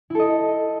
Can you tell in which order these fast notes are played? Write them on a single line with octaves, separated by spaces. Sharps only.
E4 A4 D#5